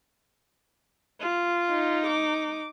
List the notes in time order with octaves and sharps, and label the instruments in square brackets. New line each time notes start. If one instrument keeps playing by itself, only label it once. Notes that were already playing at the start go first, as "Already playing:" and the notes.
[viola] F4
[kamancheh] D#4
[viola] D6